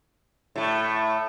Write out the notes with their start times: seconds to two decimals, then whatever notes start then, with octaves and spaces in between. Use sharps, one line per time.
0.56 A2 A3